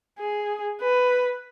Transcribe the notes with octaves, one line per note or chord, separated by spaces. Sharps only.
G#4
B4